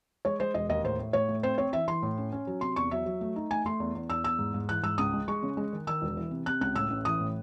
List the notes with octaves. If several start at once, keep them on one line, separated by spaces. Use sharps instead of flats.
G#3 C#5
G#3 C5
E1 D#5
D#2 D#5
A2 C5
A3
A2 C#5
A3
C4 C5
C4 C#5
E3 E5
E3 C6
A2
C#4
C#4
F#3
C3 C6
E2 C#6
F#3 E5
F#3
A3
D#4
A3 G#5
A3 C6
E2
E2
E2 E6
E2 E6
G#2
G#2
E3 F#6
G#2 E6
C#2 D#6
G#3
G#3 C#6
C#3
G#3
D#3
D#3 E6
E1
E3
C3
C3 F#6
C#2 F#6
A2 E6
A1
E3 D#6
A2